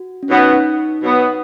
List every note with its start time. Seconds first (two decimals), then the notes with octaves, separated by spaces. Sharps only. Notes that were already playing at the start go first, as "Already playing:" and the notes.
Already playing: F#4
0.23 C#4
0.30 B2 F#3 B3 D#4
1.02 B2 F#3 B3